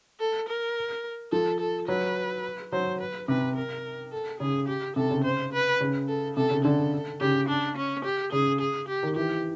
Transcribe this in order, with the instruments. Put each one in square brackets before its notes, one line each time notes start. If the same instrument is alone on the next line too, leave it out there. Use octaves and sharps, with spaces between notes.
[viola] A4
A#4
[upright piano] F3 [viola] A4
[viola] A4
[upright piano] F#3 [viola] B4
[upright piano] F#3 [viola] C5
[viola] B4
[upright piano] C3 [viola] B4
[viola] A#4
A4
[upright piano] C#3 [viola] G#4
[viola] G4
[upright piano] C3 [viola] A4
[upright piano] C#3
[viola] C5
B4
[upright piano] C#3
[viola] A4
[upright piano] C3 [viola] A4
[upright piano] C#3
[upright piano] D3 [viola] A4
[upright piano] C#3 [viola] G4
[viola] D4
C#4
G4
[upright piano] C#3 [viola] G#4
[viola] G#4
G4
[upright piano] D#3
[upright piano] E3 [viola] G4